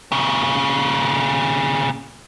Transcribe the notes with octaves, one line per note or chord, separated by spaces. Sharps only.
A#2 C#3